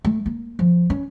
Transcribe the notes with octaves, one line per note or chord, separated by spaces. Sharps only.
A3
A#3
F3
C#4